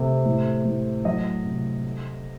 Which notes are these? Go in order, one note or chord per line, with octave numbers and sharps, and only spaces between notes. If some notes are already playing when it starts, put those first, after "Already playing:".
Already playing: C3 A3
A2
A2
F#3 D#5
C3
A3